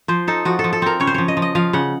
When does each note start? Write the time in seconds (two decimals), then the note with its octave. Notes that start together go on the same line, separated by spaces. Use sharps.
0.08 F3 C5
0.28 D#4 A4
0.45 F3 F#4
0.59 A4
0.64 F3
0.73 A4
0.82 C4 A#4
1.00 C#3 C#5
1.07 C5
1.14 F3 C#5
1.28 D#5
1.37 F3
1.42 D#5
1.55 F3 F5
1.73 C#3 F#5